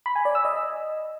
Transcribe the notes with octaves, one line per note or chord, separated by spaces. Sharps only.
B5
G#5
D5
E6
D#5